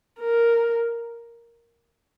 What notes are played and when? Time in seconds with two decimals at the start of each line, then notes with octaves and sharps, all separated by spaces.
0.20 A#4